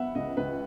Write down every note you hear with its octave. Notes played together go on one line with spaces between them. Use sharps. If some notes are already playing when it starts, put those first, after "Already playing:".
Already playing: B3 E5 F#5
C#2 D#5
C#2 B4